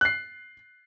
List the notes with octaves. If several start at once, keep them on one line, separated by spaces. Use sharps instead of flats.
F#6 C7